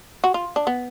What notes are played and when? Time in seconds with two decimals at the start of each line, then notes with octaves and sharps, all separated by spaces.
0.24 F#4
0.34 F4
0.56 D4
0.67 B3